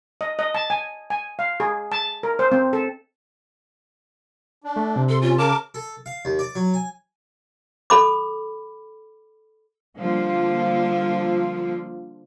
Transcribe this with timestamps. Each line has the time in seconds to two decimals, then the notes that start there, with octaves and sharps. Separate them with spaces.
0.21 D#5
0.39 D#5
0.55 A5
0.70 G#5
1.10 G#5
1.39 F5
1.60 G#4
1.92 A5
2.23 A#4
2.39 C5
2.52 C4
2.73 A4
4.64 D4
4.76 A3
4.96 C3
5.09 A4 C6
5.22 C#4 F4
5.38 C#3 A#4 A5 D6
5.75 A4
6.06 F5
6.25 D#2
6.39 D5
6.55 F#3
6.74 G#5
7.90 A4 B5 D6
9.99 D3 F3 G3 A#3 F4